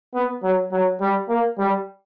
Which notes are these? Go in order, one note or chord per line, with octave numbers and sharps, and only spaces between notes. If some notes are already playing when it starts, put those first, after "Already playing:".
B3
F#3
F#3
G3
A#3
G3